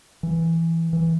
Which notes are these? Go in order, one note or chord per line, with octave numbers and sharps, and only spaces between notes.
E3
E3